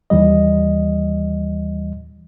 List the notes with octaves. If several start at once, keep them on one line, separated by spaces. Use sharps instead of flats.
D#2 E3 G3 D#5